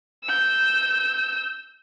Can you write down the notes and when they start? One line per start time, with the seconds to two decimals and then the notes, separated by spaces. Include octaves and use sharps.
0.24 E6 G6